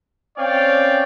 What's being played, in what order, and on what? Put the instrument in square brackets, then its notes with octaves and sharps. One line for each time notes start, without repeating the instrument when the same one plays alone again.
[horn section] C4 C#4 C#5 D5 F5 G5